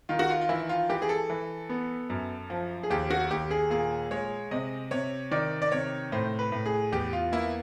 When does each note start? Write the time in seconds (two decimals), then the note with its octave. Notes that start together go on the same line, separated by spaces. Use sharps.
0.09 D#3 F4
0.19 F#4
0.30 F4
0.41 F4
0.49 E3 E4
0.69 F4
0.89 E3 G4
1.02 G#4
1.09 A4
1.30 E3
1.69 B3
2.10 F#2
2.50 F3
2.83 G#4
2.90 D#2 G4
3.11 F#4
3.31 D#2 G4
3.51 G#4
3.70 A#2 G#4
4.11 G#3 C#5
4.51 C3 D#5
4.91 C3 C#5
5.31 D#3 D5
5.62 D5
5.71 C3 C#5
6.12 A2 C5
6.39 B4
6.52 A2
6.66 G#4
6.92 E2 G4
7.13 F4
7.32 A#3 E4